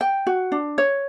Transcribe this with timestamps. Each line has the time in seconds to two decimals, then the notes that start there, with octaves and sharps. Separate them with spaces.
0.01 G5
0.27 F#4
0.52 D4
0.78 C#5